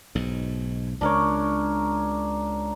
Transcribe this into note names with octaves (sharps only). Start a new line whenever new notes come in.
B1 G#2
C#2 D4 A#4 C#5